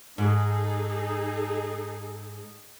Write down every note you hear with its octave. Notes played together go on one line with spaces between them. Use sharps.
G#2 D#4 G#4 A4